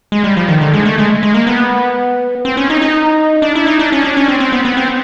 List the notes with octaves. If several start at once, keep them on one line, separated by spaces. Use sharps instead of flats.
G#3
G3
F3
D#3
D3
G#3
A3
G#3
G#3
A#3
B3
C4
C#4
D#4
D#4
D4
E4
D#4
D4
C#4
D4
C#4
C4
C4
B3
B3
C4